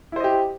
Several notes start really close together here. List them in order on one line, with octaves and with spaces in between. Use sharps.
E4 C5 D#5 G4